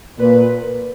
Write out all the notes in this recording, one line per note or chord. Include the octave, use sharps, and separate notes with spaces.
A#2 B4